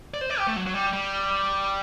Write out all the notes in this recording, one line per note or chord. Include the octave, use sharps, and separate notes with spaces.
D5
C5
D5
G4
A3
F#3
F#3
G3
G3